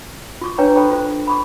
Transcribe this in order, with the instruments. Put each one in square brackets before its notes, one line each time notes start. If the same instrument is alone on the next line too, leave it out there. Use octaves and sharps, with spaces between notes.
[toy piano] F4 C#6 D6
D4 B4 C#5 G5 G#5 A#5
A4 C5 G5 B5 C#6
F4 C5
B5 C#6 D6